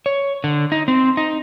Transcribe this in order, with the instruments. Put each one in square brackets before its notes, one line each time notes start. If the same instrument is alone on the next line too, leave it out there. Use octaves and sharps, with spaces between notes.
[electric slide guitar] C#5
D3
D#4
C4
D#4